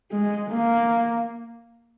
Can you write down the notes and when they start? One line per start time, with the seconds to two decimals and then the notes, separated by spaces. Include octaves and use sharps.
0.11 G#3
0.50 A#3